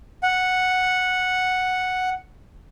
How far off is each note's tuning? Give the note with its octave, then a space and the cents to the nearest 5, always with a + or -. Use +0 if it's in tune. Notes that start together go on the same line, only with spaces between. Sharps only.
F#5 -5